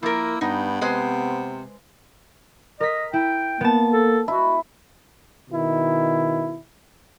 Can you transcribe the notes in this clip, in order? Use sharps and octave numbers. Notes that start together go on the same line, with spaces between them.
F3 A#3 E4 A#4
G2 B3 D#4
C3 G#3 B4 C5
A#4 D#5 B6
E4 G5
A#3 B3 A5
A4
E4 F#4
B2 D#3 E4